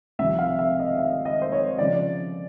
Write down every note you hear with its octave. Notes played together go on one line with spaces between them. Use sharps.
C2 C3 F3 E5
F5
E5
D#5
E5
D#5
C5
C#5
C#3 F3 D5